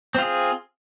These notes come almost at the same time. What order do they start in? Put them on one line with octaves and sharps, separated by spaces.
C4 F4 G#4